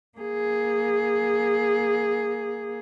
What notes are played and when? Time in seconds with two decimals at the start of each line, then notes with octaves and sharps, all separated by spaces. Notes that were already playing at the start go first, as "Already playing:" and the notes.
0.18 A#3 G#4